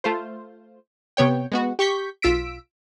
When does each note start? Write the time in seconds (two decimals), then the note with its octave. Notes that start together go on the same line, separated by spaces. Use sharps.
0.04 A3 F4 C5
1.17 C3 B3 C#5 G5
1.52 G#3 B3 F#4
1.79 G4 C#6 G6 B6
2.22 B1 F4 E6 B6 D7